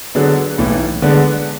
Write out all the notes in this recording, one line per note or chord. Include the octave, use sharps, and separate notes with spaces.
D3 F#3 B3 D4 G#4
B1 A2 E3
D3 G#3 B3 D4